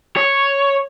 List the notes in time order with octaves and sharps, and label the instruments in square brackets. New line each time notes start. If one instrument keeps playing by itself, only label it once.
[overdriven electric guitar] C#5